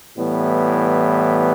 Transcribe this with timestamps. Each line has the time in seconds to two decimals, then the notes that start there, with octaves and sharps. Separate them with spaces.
0.16 A2 E3 G3 B3